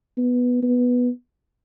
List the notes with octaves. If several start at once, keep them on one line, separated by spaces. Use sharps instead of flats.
B3
B3